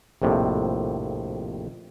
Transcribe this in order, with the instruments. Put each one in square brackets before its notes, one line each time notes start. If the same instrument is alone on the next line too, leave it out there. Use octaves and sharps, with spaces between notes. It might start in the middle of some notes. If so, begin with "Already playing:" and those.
[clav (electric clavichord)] A#1 F2 A2 C3 G3